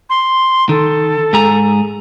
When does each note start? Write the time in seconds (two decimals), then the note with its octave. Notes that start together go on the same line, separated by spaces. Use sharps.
0.10 C6
0.69 D#3 A4
1.33 G#2 G#4 A#5